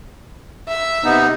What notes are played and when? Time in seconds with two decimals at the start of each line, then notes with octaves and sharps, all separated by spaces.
0.68 E5
1.04 C3 B3 D#4